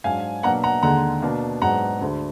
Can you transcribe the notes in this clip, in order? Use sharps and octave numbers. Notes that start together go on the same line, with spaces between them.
G#2 F#3 D4 F5 G#5
B2 F#3 A#3 D4 F#5 A#5
F#5 A#5
D#2 D3 G#3 F#5 A#5
B2 A#3 D4
G#2 F#3 B3 D4 F#5 A#5
D2 D3 G#3 D4